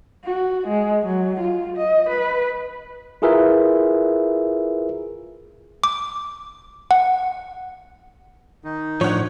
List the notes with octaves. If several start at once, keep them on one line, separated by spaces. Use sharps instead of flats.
F#4
G#3
F#3
F4
D#5
B4
E4 F4 G#4 A#4 B4 E5
D6
F#5
D#3 D#4
A2 F3 D4 C#5 F#5